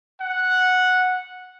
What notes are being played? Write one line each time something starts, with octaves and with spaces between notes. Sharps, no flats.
F#5